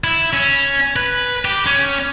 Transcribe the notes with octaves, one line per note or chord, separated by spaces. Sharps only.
E4
C#4
B4
G4
C#4